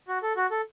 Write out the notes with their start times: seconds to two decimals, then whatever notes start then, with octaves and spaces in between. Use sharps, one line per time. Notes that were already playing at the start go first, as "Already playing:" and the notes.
0.08 F#4
0.23 A4
0.36 F#4
0.51 A4